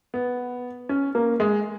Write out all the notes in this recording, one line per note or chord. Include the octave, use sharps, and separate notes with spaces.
B3
C#4
A#3
G#3